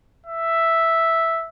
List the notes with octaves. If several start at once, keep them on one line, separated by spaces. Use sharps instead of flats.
E5